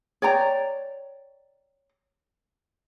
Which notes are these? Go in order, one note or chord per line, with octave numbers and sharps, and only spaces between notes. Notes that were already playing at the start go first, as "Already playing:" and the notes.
C#5 D5 G5 A#5